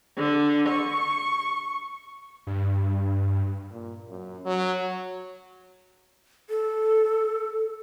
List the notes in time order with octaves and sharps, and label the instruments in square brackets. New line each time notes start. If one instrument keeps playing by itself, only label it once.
[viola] D3
C#6
[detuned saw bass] G2
[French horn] A#2
F#2
F#3
[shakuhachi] A4